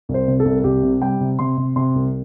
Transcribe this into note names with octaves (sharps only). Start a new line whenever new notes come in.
C2
C5
C3
A4
C2
C2 G4
C3
G3 G5
C3
C3 C6
C3
C3 C6
C2